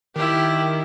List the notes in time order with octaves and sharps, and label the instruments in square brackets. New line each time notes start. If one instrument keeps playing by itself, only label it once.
[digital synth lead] D#3 [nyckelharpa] E4 G4